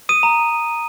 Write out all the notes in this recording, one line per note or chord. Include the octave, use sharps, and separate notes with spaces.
D#6 D#7
A#5